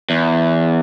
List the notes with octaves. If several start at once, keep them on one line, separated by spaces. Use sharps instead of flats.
E2